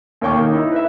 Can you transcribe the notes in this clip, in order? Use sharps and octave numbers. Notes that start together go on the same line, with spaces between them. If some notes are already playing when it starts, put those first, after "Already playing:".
D#2 A#3 C#5 G5 C#6 D6
D#3
D#4 E4
B4 E5